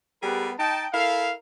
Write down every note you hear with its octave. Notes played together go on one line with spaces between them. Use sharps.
G3 B3 G4 G#4 A#4 B4
D#4 G5 A5
E4 A4 A#4 F5